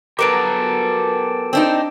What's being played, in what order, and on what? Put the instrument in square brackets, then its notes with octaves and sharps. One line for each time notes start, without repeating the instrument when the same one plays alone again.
[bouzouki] F#3 B3 A#4 [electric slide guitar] G4 A4 [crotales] D6 D7
[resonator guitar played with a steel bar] C4 D4 D#4